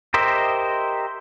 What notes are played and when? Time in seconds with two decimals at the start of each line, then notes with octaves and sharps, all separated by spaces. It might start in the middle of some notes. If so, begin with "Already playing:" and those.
0.14 G4 A#4 C5 D#5 E5